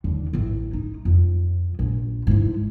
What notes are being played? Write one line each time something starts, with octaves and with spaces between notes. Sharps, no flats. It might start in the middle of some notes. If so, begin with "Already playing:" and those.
D#2 D3
A1 E3
D#4
F2
A#1
G#2 E3